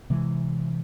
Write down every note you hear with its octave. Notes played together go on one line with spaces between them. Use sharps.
C3 E3 G#3